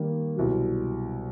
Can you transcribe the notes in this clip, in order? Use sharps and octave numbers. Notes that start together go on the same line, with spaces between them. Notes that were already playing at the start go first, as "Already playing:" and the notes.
Already playing: D#3 G3 A#3
C2 B2 F#3